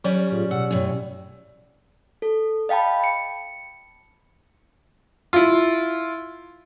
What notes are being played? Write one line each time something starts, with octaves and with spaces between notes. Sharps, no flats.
F#3 G3 C#4
A2 F4 G#4
B2 F#5 E6
F#2 A2
A4
D#5 F5 G5 A5 B5
C#7
E4 F4